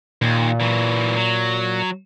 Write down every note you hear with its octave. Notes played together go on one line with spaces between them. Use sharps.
D#2 A#2
E3 F#3
F#3